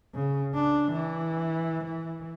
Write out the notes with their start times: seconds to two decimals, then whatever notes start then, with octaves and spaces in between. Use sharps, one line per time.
0.15 C#3
0.55 D4
0.92 E3
1.85 E3